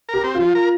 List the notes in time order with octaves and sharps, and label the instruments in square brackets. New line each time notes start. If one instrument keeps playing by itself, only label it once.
[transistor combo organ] A#4
[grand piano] G4
[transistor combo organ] C4
[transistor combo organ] F3 [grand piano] F4
[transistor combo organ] A#4